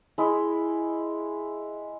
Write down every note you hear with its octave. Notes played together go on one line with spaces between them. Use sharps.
G#3 E4